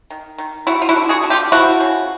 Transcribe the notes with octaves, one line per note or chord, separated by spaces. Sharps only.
D#3
D#3
G3 E4 F#4
F4
E4 F#4
D3
F#4 G#4
D3
F4 G4
F3 E4 F#4
C#3